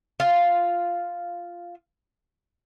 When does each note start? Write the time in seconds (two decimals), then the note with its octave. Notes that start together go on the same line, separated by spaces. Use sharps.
0.20 F4 F5